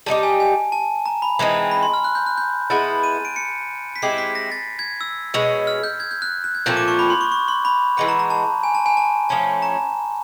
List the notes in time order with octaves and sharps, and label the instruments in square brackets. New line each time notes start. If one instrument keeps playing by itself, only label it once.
[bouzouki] G3 C4 D#4 G4 [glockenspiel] A5
[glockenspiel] G#5
G#5
A5
A#5
B5
[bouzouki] E3 G#3 C4 D#4
[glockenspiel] B5
C6
F6
F#6
G6
F#6
G6
[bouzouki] G#3 B3 E4 [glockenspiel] A6
[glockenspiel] D#7
D7
C#7
B6
[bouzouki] G#3 C4 E4 G4 [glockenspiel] C7
[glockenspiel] B6
A#6
A6
G#6
E6
[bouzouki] B2 G#3 C#4 [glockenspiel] E6
[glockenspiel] F6
G6
G#6
G6
F#6
F#6
G#6
[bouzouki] A#2 F3 A3 C4 [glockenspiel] G6
[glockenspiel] D6
C#6
B5
C6
C#6
C#6
C6
B5
[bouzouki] E3 G#3 B3 [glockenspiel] B5
[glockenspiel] A#5
A#5
A5
G#5
A5
G#5
A5
[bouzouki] F3 A3 C#4 [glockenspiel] A5
[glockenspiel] A#5